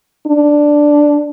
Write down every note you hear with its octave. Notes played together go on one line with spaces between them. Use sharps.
D4